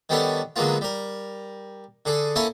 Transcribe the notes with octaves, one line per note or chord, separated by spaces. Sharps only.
D#3 G3 B3 C#4 D4 A4
D3 F#3 G#3 A#3 B3 F4
G3 A#4
D3 G#4 A4
A#3 C#4 E4 A4 G#5 A5